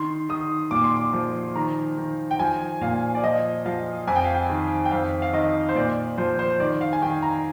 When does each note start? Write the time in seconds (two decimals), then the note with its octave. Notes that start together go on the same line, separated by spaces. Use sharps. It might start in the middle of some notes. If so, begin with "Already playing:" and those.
Already playing: D#3 C6
0.29 D#3 D#6
0.71 A#2 D6
0.84 C6
0.97 D6
1.13 F3
1.56 D#3 A#5
1.97 D#3
2.31 G5
2.39 F3 G#5
2.81 A#2 F5
3.15 D5
3.23 F3 D#5
3.66 F3 F5
4.07 F2 G#5
4.16 G5
4.25 F5
4.34 G5
4.50 D#3
4.85 G5
4.91 F2 F5
5.22 F5
5.33 D#3 D#5
5.69 C5
5.75 A#2 D5
6.18 F3 C5
6.39 C5
6.60 D#3 D5
6.81 F5
6.93 G#5
7.02 D#3 G5
7.22 A#5